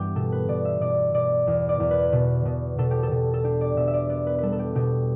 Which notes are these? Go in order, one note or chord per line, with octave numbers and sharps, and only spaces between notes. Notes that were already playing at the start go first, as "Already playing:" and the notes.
Already playing: G2 E3 B3 E4 G4
B2 A4
B4
B2 D5
E5
B2 D5
B2 D5
E2
D5
E2
B4
B2
B2
B2 A4
G4
A4
B2
A4
D4 G4
D5
B2 E5
E5
D5
B3 D5
B4
G3 A4 B4
A4
G4
B2 G4